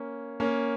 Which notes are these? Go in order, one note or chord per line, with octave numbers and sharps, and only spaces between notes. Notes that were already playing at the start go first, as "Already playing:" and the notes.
Already playing: A#3 C#4
A#3 C#4